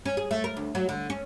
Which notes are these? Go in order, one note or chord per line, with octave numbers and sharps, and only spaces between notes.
C#4
G#4
A3
A#4
D2
F#3
D3
C#4